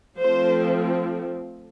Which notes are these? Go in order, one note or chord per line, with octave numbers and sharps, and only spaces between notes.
F3 A3 C4 C5